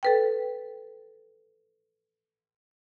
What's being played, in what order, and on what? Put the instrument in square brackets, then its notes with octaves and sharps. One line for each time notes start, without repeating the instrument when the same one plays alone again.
[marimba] A4 B4 G5